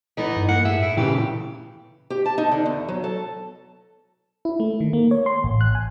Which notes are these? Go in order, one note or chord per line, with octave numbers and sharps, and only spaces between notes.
E3 B3 D#4
G2
A#3 F#5
A2 G#4 E5
E4
A#2 C#3 E3 G4
G4
A5
D#4
D3
E2
F#3
A4
E4
A3
D#3
A#3
C#5
C6
A1
F#6
G#5